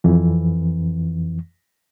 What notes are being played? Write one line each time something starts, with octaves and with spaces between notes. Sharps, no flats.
F2 E3